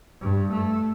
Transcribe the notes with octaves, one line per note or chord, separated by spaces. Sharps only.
G2
A3